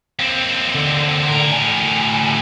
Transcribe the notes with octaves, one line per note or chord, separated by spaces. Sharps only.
D#2 C4
D3
A2 A#4
D2 G#5